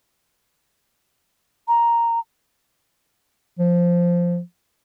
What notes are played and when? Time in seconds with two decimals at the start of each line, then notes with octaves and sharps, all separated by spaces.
1.68 A#5
3.59 F3